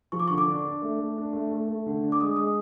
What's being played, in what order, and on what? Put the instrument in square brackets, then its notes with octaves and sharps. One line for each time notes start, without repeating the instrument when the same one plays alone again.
[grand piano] F3 [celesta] C#6
[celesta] D6
[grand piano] D3 [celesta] C#6
[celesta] D6
[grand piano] D4
D4
A3
A3
D4
A3
A3
A3
D3
D4
[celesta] D6
[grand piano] G#3 [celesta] D#6
[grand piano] G#3 [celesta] D#6